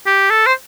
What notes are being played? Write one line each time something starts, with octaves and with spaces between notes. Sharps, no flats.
G4
A4
C5